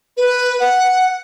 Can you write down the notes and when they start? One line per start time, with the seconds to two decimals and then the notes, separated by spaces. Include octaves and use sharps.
0.17 B4
0.60 F#5